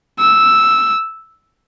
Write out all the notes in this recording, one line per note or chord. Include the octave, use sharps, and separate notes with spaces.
E6